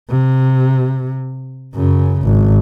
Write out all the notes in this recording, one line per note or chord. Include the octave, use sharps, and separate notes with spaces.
C3
F#2 C#3
G#1